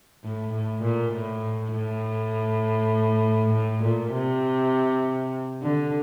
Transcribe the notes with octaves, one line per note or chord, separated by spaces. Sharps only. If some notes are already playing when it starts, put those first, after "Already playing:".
A2
A2
A#2
A2
A2
A2
A#2
C3
D3